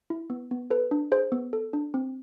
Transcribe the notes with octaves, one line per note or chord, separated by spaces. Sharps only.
E4
B3
B3
A4 B4
D4
G#4 C5
B3
A4
D4
C4